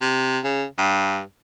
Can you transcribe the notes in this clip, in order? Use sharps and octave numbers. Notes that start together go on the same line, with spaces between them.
C3
C#3
G2